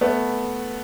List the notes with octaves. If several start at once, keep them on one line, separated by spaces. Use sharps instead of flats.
A3 B3